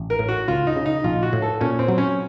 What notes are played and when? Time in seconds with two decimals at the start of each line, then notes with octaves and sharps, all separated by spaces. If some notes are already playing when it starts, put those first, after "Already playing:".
Already playing: A1
0.10 A#4
0.19 A2
0.29 F#4
0.48 C#2 F4
0.67 D#4
0.76 C#3
0.86 D#4
1.04 A#1 F4
1.23 F#4
1.33 A2
1.42 A4
1.61 A#2 C#4
1.79 C4
1.88 F#3
1.98 C#4